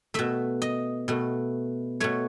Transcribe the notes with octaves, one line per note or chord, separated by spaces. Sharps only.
B2 A3 E5
D#5
B2 A3
B2 A3 C#5